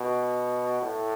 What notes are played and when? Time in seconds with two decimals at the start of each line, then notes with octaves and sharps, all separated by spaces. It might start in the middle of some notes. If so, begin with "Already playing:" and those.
Already playing: B2
0.82 A2